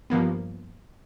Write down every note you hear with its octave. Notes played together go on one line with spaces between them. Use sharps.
G2 F3 A#3 B3